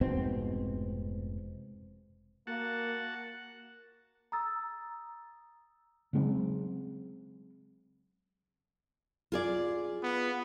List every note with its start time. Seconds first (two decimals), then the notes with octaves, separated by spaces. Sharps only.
0.01 F1 G#2 B2 C4
2.47 A#3 F#4 F#5 A5
4.32 A#5 D#6 E6 A6
6.13 C#3 F#3 G#3 C4
9.32 F4 G#4 D5
10.03 B3